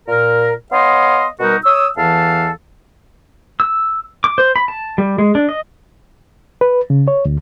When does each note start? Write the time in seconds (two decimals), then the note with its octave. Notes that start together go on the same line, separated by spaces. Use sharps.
0.08 A#2 A#4
0.72 B3 C#5 D#5 F5 C6
1.40 B2 G3 D#4 F#4 A#4
1.65 C#5 D#6 E6
1.98 E2 E3 A4 F5 A5
3.60 E6
4.24 D6
4.38 C5
4.56 B5
4.68 A5
4.98 G3
5.18 G#3
5.35 D4
5.49 D#5
6.61 B4
6.90 C#3
7.08 C#5
7.25 D2